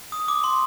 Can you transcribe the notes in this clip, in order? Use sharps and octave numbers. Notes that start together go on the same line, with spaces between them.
D#6
D6
C6